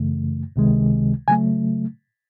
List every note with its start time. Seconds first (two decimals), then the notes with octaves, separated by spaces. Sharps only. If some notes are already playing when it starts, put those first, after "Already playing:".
Already playing: F#2 C#3 E3 A3
0.56 C#2 C3 D#3 G#3
1.28 C#3 F#3 A3 G#5